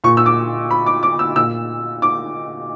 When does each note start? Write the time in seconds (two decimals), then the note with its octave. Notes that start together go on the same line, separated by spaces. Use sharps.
0.04 A#2 C#6
0.17 E6
0.26 D6
0.71 B5
0.86 D6
1.03 D6
1.19 E6
1.36 A#2 E6
2.02 D6